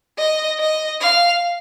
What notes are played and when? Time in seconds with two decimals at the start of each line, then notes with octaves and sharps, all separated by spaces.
0.18 D#5
0.60 D#5
1.01 F5